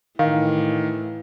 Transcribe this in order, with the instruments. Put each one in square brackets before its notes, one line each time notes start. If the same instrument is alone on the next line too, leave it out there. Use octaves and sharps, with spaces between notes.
[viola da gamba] A2 E3 [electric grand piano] D#3 [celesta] F5